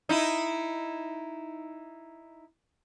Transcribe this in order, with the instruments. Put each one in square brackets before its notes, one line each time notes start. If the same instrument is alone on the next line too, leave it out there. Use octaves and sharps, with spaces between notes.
[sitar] D#4 E4